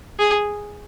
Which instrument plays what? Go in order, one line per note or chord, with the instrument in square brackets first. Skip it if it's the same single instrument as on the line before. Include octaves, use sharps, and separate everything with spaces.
[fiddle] G#4